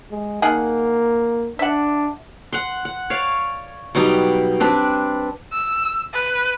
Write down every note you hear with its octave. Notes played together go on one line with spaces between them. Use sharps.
G#3
D#3 A#3 G#4 F#5
D4 E5 F#5
F#5 C6
F#5
C#5 D5 F5
B2 F#3 G3 D#4
C4 D4 B4
E6
B4